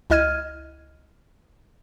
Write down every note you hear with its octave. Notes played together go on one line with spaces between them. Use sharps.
C#2 E4 D#5 F6 G#6 D#7